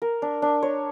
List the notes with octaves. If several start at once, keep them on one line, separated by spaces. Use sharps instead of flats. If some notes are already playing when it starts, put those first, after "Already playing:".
A#4
D4
D4
C#5